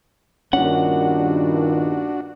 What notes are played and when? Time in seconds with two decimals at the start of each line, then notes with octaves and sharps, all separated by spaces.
0.53 G2 A#2 D#3 C#4 D4 F#4 F#5